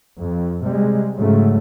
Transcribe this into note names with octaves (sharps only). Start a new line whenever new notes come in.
F2
C3 G3 G#3
G#2 C#3 F#3 A3